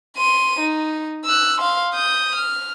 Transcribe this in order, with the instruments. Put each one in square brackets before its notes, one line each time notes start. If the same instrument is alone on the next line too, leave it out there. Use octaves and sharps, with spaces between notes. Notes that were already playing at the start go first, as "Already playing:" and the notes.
[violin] C6 D#7
D#4
E6 F#6
F5 C6
D#6 G6
F6